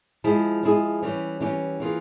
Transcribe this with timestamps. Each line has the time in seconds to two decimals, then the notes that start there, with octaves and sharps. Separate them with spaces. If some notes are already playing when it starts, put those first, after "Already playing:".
0.24 F3 G#3 E4 G#4
0.63 F3 G#3 E4 G#4
1.03 E3 G3 C#4 G4
1.40 E3 G3 C#4 G4
1.80 E3 A#3 F4 G#4